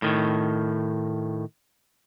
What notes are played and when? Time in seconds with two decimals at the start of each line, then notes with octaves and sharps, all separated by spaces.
0.02 A2 D#3